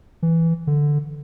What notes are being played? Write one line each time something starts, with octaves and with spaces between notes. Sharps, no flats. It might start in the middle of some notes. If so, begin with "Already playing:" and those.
E3
D3